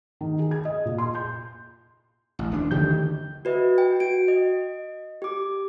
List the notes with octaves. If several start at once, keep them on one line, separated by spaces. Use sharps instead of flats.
D#3
G#4
G#6
D#5
A#2
C6
G6
A1
D#1 D4
D2 D3 D#3 G4 G6
F#4 B4 D#5 E5
G5
F#4 D7
D#5
G4 D6